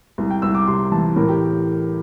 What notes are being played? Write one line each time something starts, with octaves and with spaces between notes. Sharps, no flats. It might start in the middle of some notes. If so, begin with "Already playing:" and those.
C2
G5
C2 E6
D6
C3 C6
E3 A5
A2 A#4
G4